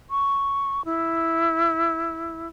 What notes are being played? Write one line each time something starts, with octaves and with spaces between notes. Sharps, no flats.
C#6
E4